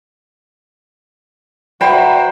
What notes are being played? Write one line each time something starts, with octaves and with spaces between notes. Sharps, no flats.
F#4 B4 C5 D5 E5 G5 A#5 B5